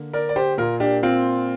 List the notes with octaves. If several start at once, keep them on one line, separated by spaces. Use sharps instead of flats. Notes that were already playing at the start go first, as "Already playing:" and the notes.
Already playing: D3 A#3
A#4 D5
D5
G4 C5
A#2 A#3 F4 A#4
D4 G4
C4 F4